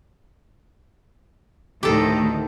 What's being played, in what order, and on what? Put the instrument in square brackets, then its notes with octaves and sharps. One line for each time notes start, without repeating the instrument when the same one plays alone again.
[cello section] D2 A2 D#3 [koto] G4 A4